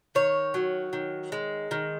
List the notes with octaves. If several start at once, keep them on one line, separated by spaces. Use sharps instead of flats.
D#3 C#5
F#3
D#3
G#3
D#3